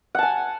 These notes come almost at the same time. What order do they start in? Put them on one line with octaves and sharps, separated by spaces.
F#5 A5 G#5